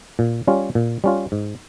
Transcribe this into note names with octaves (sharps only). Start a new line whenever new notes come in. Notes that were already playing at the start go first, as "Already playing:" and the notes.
A#2
G3 C#4 F4
A#2
G3 C#4 F4
G#2